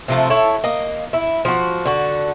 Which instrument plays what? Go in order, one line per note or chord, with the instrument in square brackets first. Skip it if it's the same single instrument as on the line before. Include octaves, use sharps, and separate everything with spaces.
[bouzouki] C3 F3 A3
E4 A4 C#5
A#3 D#5
E4
F3 F#4
D3 F#4